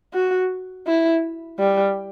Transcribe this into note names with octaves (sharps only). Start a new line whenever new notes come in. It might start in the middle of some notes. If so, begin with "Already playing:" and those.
F#4
E4
G3